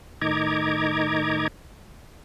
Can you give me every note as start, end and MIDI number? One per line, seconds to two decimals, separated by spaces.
0.21 1.48 45
0.21 1.48 51
0.21 1.48 63
0.21 1.48 82
0.21 1.48 86
0.21 1.48 92